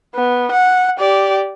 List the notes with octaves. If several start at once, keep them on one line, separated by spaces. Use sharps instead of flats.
B3
F#5
G4 D5